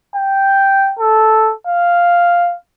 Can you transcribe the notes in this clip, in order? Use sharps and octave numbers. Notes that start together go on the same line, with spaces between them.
G5
A4
F5